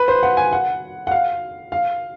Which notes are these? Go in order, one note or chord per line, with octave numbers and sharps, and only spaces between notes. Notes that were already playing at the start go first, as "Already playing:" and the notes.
Already playing: B4
C5
F#5
G#5
F#5
F#5
F5
F5